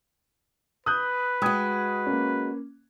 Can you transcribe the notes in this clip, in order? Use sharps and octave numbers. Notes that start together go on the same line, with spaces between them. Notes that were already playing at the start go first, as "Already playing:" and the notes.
B4 D#6 F#6 G6
G#3 F#4 G5 D#6 G#6
A#3 C#4